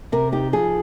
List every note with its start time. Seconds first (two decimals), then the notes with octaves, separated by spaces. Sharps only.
0.12 C3 A#4
0.32 D#4 G4
0.53 F3 G#4